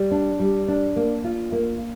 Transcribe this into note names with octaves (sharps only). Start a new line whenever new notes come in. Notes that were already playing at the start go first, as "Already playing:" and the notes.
Already playing: G3
D4
G3
D4
A#3
F4
A#3